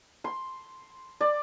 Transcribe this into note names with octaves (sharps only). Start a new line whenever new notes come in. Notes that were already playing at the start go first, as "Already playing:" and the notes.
C6
D5